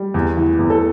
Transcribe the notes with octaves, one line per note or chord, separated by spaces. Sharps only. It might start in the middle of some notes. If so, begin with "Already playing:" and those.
Already playing: G3
E2
E3
E2
A4